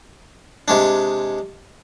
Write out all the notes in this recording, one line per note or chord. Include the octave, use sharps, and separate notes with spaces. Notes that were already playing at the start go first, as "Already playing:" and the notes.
C3 G#3 D4